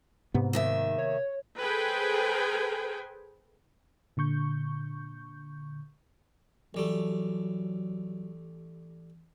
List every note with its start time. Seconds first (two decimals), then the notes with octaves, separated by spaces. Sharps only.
0.34 G#2 C3 B3
0.53 D#2 D#3 E5
0.98 C#5
1.61 G#4 A4 B4 C5 G5 G#5
4.17 A#2 D3 C#6 G6
6.74 A1 F#3 G3 A3